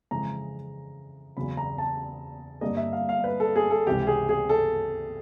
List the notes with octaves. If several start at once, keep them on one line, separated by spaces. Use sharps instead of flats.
F2 C#3 E3 G#3 A#5
E2 C#3 F#3 B5
A#5
A5
G2 D3 G3 A#3 D#5
E5
F5
F5
B4
A4
G#4
A4
C#2 C3 E3 G4
G#4
G#4
A4